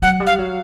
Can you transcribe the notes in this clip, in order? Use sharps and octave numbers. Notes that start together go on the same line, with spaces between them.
F#3 F#5
G3
F5
F#3